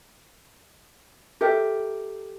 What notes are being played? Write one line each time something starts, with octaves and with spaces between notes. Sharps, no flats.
G4 A4 A#4 E5